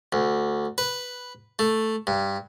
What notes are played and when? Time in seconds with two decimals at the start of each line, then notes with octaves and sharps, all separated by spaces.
0.13 D2
0.78 B4
1.59 A3
2.07 G2